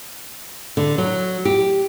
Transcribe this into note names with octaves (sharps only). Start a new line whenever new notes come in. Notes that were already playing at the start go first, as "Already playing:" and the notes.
D3
F#3
G4